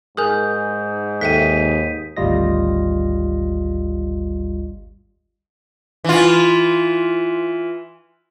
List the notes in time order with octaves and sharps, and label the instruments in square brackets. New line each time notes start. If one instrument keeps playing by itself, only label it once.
[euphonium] G#2 [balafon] G#4 A#4 G#5 [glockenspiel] D#6 G6
[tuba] D#2 [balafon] A4 E5 G5 [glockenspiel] B6 D#7
[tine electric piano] G#1 D2 G3 F4 D#5 A#6
[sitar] E3 F4